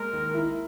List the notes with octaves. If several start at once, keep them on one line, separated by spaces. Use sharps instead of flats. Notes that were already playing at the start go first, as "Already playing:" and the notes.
Already playing: G#3 A#3 A#4
D#3
E4